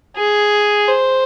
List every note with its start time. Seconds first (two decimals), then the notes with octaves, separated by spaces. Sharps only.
0.17 G#4
0.88 C5